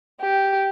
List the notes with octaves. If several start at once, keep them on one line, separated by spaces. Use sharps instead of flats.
G4